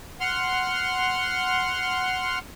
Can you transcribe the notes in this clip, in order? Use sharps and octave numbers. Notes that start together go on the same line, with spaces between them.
F#5 C6 F6